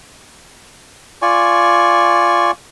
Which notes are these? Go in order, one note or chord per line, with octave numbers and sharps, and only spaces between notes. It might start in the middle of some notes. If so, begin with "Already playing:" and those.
F4 D5 G#5 C#6